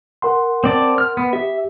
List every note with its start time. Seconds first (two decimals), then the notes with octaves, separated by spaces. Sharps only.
0.22 A#4 F#5 C6
0.64 C4 D5 A5
0.98 F6
1.17 B3
1.33 G4 E5